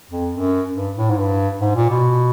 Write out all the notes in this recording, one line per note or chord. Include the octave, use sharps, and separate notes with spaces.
F2
F#2
G2
A2
G#2
G2
G#2
A#2
B2